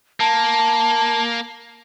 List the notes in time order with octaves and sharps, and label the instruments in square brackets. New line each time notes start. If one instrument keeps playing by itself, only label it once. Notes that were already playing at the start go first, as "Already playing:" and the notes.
[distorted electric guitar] A#3 [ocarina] A5